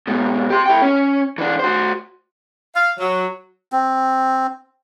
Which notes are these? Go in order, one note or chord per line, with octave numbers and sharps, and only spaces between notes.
G#2 B2
G4 C6
E4 G5
C#4
E3 D4
F#4 C5
F5
F#3
C4